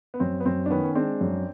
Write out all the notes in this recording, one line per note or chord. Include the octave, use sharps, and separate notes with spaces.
B3
F#2 C4
B3
F#2 C4
D4
D#3 B3 C#4
C#4
G#3 C4 D4
F#2